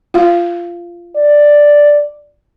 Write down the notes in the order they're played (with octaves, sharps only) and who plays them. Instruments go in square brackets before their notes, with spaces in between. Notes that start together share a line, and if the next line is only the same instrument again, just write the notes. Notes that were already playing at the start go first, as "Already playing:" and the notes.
[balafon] F4 F5
[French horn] D5